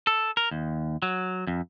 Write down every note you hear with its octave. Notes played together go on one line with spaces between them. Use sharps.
A4
A#4
D#2
F#3
F2